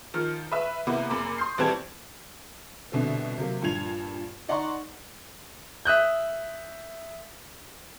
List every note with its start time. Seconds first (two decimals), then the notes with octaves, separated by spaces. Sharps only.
0.14 D#3 F3 F6
0.52 B4 E5
0.87 C3 A#3 B3 E4 B4
1.10 F#1 F#2 A#3 B5 D6
1.38 C6 D#6 G6 C7
1.58 A#1 E3 G3 C4 A5 G#6
2.92 C2 B2 D3 C4
3.38 C3 F#3 A#3
3.62 G2 A#2 F3 G#6 F7
4.48 D#4 D5 F#5 A#5 C6 C#6
5.85 E5 D#6 F#6 G6